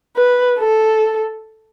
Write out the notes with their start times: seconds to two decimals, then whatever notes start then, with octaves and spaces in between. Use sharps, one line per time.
0.16 B4
0.59 A4